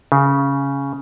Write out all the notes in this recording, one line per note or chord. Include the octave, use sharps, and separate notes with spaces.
C#3